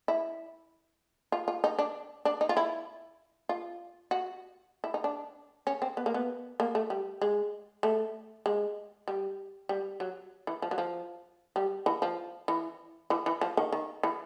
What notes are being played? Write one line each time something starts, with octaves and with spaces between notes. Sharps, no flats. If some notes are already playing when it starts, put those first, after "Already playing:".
E4
F4
F4
D#4
D4
D4
D#4
F4
E4
F4
F#4
E4
D#4
D4
C#4
C4
B3
A#3
B3
A#3
A3
G3
G#3
A3
G#3
G3
G3
F#3
E3
F3
F#3
F3
G3
E3
F3
E3
E3
E3
F3
D#3
D#3
E3